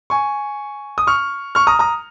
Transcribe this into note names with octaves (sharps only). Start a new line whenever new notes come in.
G#5 C#6
D#6
C#6 F6
C#6 F6
A#5 D#6
A#5 D#6